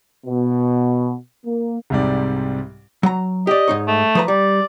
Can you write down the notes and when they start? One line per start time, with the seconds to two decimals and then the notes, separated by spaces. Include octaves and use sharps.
0.25 B2
1.45 A#3
1.90 C2 G#2 C3 G3 D5
3.03 F#3 A#5
3.47 G4 D5 D#5
3.68 G#2 D#4 C#5
3.87 A3
4.15 F3 B4 A#5
4.28 G3 D5